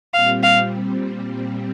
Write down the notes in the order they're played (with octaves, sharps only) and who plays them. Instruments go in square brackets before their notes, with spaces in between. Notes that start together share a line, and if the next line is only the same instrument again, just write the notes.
[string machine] A#2 G3 C4 [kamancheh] F5
[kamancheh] F5